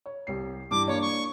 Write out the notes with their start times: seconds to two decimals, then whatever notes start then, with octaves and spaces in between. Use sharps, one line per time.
0.06 C#5
0.27 C2 G4 C7
0.71 G2 E3 D6
0.88 A#3 D4 C#5
1.01 C#6